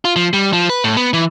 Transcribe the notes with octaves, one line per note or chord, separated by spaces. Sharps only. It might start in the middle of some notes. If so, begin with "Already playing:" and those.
F4
F3
G3
F3
B4
A2
B3
E3